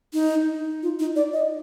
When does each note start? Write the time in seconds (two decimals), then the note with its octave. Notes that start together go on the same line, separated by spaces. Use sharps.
0.14 D#4
0.83 F4
0.99 D#4
1.16 D5
1.33 D#5